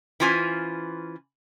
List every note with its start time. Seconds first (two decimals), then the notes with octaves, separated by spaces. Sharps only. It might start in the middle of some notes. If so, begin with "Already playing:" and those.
0.20 E3 C#4 F4 C5 G#5